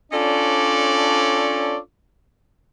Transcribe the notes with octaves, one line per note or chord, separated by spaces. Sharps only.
C#4 D4 F4 A4 C#5 D5